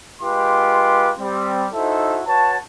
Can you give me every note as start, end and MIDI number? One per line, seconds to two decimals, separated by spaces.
0.22 1.12 56
0.22 1.12 65
0.22 1.12 67
0.22 1.12 71
0.22 1.12 84
0.22 1.12 86
1.19 1.66 55
1.19 1.66 60
1.73 2.21 63
1.73 2.21 64
1.73 2.21 66
1.73 2.21 69
1.73 2.21 72
1.73 2.21 76
2.26 2.56 66
2.26 2.56 71
2.26 2.56 73
2.26 2.56 81